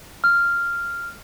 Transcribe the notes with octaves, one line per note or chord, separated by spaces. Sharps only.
F6